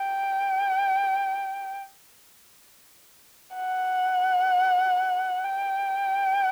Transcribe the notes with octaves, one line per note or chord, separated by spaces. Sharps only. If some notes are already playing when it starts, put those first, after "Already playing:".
Already playing: G5
F#5
G5